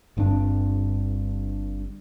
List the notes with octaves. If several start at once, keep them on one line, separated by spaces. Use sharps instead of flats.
G1 G2 C4 D4